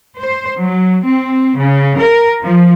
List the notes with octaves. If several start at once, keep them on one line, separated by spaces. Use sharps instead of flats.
C5
F#3
C4
C#3
A#4
F3